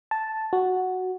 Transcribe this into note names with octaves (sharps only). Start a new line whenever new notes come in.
A5
F#4